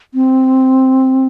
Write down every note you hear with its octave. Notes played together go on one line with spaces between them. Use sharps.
C4